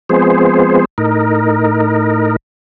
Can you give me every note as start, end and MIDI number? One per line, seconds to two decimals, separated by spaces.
0.09 0.85 53
0.09 0.85 56
0.09 0.85 59
0.09 0.85 60
0.09 0.85 68
0.09 0.85 72
0.98 2.36 45
0.98 2.36 63
0.98 2.36 70